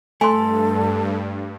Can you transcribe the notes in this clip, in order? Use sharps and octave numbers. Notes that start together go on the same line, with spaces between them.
G2 A3 A4 G#5 C6